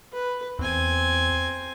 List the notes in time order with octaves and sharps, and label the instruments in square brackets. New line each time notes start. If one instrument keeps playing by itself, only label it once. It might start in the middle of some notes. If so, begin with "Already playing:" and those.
[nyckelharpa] B4
[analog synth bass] E2 [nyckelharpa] C4 G#5